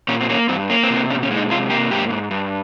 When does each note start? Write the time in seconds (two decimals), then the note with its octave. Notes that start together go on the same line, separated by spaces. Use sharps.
0.08 A#2 C#4
0.21 C4
0.29 A#3 C#4
0.49 G2 C4
0.69 A#3 C#4
0.83 C4
0.90 C3
0.96 C4
1.10 A#2 C#4
1.23 C#4
1.31 G#3
1.37 D#4
1.50 C3 F4
1.70 A#3 G4
1.91 G#2 G4
2.10 G#2
2.31 G2